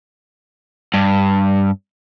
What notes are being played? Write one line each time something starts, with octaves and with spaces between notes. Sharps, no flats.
G2